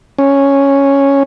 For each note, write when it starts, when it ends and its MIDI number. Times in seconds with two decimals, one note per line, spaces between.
0.18 1.23 61